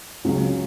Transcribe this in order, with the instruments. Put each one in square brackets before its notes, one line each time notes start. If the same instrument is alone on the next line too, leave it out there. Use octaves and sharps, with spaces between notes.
[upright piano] C#2 C#3 F#3